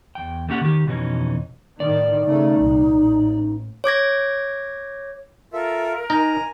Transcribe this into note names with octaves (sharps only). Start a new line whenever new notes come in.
E2 G5
A3 A#3 C#4 G4 F#5
D#3 G4
F2 B2 E3 C#4 D#4
A2 D#3 D5
C#3 A3 D#4
C2 A#2
A1
C#5 D6 G#6 A#6
F4 A4 A#4 E5
D#4 G#5 A#5